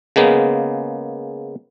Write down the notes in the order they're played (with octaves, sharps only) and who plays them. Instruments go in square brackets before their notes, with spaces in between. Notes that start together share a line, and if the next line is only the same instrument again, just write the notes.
[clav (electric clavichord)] C#3 G#3 A#3 B3